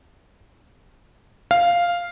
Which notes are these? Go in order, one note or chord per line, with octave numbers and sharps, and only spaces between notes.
F5